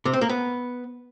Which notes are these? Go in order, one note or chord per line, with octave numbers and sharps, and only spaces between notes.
C3
C4
A#3
B3